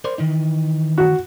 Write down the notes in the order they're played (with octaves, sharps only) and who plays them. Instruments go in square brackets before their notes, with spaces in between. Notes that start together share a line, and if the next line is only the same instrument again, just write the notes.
[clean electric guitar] A#4 C5 D5
D#3 E3 D#4
[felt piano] F#4